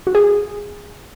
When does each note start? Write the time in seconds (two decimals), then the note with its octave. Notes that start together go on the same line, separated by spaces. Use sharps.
0.07 F#4
0.15 G#4